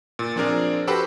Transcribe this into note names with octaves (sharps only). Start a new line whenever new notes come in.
A#2
F3 C4 D4 G#4 A#4 D5
F#4 G4 A4 B4 C5 B5